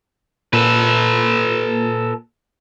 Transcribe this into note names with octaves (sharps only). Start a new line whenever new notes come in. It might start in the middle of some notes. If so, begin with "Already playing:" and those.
A#2 A4 B4